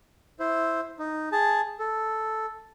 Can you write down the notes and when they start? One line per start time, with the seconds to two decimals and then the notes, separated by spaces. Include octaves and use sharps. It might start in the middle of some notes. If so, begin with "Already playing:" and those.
0.40 E4 C5
0.99 D#4
1.32 G#4 A5
1.79 A4